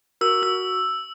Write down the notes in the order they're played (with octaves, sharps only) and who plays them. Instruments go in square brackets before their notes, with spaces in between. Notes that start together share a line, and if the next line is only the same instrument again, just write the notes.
[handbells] F#4 A#4 [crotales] E6
[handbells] F#4 [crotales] E6